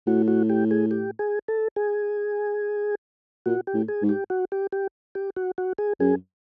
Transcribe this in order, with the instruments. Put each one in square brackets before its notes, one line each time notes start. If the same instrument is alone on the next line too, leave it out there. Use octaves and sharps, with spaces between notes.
[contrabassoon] A2 [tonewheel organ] F#4
[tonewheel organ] F#4
G4
G#4
G4
G#4
A4
G#4
[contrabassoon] A#2 [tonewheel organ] F#4
[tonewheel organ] G4
[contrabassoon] A2
[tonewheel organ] G#4
[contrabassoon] G#2
[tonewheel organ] G4
F#4
G4
G4
G4
F#4
F#4
G#4
[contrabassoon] F#2 [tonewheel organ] G#4